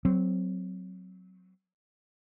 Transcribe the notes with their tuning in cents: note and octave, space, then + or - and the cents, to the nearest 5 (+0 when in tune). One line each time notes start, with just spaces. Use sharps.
F#3 +0 C4 -15